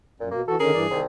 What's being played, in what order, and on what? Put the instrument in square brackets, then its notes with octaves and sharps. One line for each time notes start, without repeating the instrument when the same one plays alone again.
[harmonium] F#2 [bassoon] A#2
[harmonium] B2 [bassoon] A#3
[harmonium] E3 F#4 [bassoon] A4
[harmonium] D3 D#3 C#4 [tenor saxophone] G#4 [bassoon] A#4
[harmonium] G2 E3 D5
[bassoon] C2 [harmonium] D#3